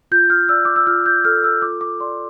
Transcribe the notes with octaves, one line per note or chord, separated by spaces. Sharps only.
F4 G6
F6
D5 E6
D6
E6
F4 F6
G6
A4 F6
E6
F4 D6
D6
D5 C6